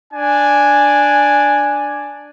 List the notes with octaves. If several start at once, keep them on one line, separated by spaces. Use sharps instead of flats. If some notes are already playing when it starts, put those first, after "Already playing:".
D4 G#5